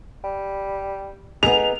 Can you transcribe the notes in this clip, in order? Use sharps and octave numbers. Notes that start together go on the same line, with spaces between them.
G3
B3 D#4 G#4 F7